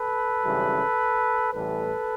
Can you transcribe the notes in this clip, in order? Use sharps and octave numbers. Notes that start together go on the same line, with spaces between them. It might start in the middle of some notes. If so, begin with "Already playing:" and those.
Already playing: A4 B4
G#1 F#2 C#3 E3 G3
A1 A2 E3 G3 A4 B4